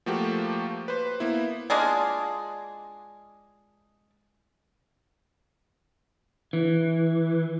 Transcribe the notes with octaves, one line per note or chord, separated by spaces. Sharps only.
F3 A3 A#3 F#4 G4
B4 C5
A#3 B3 E4
G#3 D4 F4 G#4
E3